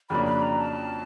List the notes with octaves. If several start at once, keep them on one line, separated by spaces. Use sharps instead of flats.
F2 C#3 F#3 A#3 D4 B5
B5
A#5
A5